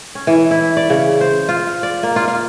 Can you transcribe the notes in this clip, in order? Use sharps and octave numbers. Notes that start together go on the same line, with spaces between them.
C#4
E3
E4
D5
C#3
C5
F4
D5
A#3
F4
F4